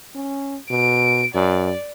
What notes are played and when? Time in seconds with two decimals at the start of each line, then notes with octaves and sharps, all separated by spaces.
0.15 C#4
0.70 B2 D7
1.35 F#2 D5